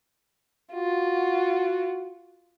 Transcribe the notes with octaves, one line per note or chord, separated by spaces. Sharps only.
F4 F#4